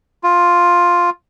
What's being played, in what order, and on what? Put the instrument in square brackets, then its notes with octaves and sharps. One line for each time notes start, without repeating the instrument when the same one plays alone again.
[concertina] F4